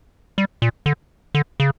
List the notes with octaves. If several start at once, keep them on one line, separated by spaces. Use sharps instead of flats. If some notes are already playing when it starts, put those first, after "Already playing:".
G3
A#2
D3
D3
C#3